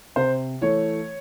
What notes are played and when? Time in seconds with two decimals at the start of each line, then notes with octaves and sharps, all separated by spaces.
0.16 C3 C5
0.61 E3 A3 C#5